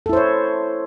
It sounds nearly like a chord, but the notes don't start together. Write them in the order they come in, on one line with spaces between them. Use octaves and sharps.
A4 E4 C5 C#5